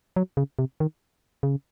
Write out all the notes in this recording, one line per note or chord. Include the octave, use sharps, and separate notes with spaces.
F#3
C#3
C3
D#3
C#3